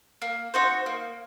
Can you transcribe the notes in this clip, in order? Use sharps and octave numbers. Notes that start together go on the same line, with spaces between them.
A#3
D#4 F#4 C5
A#3